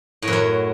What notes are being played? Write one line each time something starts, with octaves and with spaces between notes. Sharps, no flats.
A2
F#2
F#3